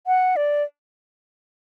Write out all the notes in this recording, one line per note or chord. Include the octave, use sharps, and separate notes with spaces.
F#5
D5